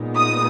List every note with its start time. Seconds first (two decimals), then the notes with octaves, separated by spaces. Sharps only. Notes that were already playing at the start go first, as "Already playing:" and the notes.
Already playing: A#2 G#3 B3 D#4
0.17 D#6